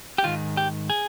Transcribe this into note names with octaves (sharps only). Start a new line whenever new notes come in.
G4
G#2 D#3 F4
G4
G#4